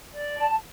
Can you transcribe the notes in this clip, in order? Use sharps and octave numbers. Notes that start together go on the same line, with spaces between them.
D5
A5